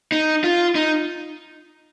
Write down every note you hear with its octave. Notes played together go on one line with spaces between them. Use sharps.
D#4
F4
D#4